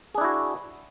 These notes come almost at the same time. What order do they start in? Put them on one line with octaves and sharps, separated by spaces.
G#4 D4 E4 F#4